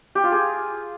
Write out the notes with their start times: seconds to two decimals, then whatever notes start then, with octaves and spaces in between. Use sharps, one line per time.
0.15 G4
0.24 F4
0.32 G#4